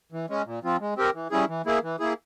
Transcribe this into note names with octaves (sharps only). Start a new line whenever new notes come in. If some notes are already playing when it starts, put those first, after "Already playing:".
E3
G#3 C#4
A#2
F3 C4 F4
G#3
C4 G4 A#4
E3
G3 C#4 E4 G#4
E3
A#3 E4 G#4
E3
A#3 E4 G#4